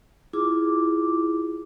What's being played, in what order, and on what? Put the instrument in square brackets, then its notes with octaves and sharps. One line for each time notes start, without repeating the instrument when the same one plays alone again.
[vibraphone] E4 F4 G#4 D6